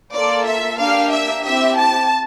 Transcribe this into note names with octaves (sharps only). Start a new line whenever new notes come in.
A#3 F4 A4 D5
E5
A#3 D4 G4 F5
E5
C4 E4 G4 E5
A5